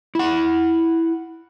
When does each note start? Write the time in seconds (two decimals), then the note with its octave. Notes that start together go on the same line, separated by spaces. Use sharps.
0.15 E4 F#5